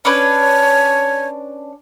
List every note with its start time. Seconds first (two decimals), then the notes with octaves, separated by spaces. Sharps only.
0.05 C#4 D4 B4 C#5